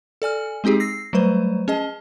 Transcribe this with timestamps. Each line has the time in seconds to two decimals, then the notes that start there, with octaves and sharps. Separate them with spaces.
0.22 A4 D5 G#5 F6
0.64 G#3 C4 D#4 G4 G#4
0.80 E6 A#6 C7
1.13 F#3 G3 A3 B4 C5
1.68 C#4 G#4 D#5 A5